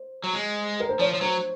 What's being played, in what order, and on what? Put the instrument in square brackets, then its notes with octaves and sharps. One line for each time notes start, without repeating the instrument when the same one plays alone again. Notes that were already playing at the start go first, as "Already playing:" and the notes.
Already playing: [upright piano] C5
[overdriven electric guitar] F#3
G#3
[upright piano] A#4
C5
[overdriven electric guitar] F3 [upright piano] C#5
[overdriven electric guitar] F3
[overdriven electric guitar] F#3 [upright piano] C5